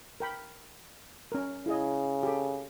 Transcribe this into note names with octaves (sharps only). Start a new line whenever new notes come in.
A#4 G5 B5
C#4 A#4
C#3 E4 G#4 D#5
G4 A4